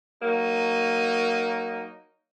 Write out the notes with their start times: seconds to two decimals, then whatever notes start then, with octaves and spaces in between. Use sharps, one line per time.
0.22 F#3 A#3 D#4